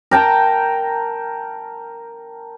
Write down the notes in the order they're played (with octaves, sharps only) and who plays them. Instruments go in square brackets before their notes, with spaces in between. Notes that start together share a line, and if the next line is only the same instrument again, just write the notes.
[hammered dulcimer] A#4 G5 A5 A#5